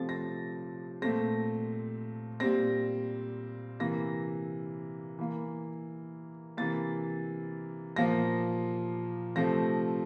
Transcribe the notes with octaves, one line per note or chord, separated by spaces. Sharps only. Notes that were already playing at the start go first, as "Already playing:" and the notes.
Already playing: C3 F3 A3 C4 A6
A#6
A#2 A3 C4 A#6
A#2 G3 C4 A#6
C3 E3 A#3 A#6
E3 A#3
C3 E3 A#3 A6
A#2 F3 A#3 A#6
C3 F3 A3 C4 A#6